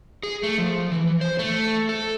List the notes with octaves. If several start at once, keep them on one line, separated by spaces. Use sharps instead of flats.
G#4
A3
F3
E3
C5
A3
A4